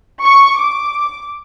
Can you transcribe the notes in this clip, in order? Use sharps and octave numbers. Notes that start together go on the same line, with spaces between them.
C#6
D6